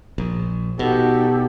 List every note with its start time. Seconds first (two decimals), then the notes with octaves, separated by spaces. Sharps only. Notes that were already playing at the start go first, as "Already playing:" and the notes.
0.18 A#1
0.79 B2 D#4 F#4 G4 A4